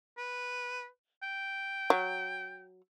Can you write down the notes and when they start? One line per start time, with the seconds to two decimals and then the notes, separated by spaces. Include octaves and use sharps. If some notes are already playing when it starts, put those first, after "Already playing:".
0.18 B4
1.23 G5
1.90 F#3